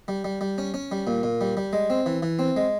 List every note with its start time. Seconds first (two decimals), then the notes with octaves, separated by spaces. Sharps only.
0.08 G3
0.24 G3
0.41 G3
0.58 C#4
0.74 C#4
0.92 G3
1.07 A#2
1.23 A#2
1.41 G3
1.57 G3
1.73 G#3
1.90 C4
2.06 E3
2.23 E3
2.39 C4
2.56 G#3